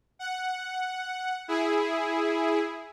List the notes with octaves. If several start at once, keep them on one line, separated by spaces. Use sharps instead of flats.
F#5
E4 G#4